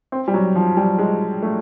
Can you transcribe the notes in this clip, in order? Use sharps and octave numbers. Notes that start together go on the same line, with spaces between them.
C4
G3
F#3
F3
G3
G#3
A3